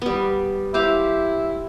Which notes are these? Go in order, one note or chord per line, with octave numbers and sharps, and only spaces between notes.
G3 B3
E4 G4 C5 F5